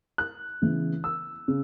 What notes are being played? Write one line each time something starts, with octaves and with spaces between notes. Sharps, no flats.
F#6
C#3 E3 B3
E6
C#3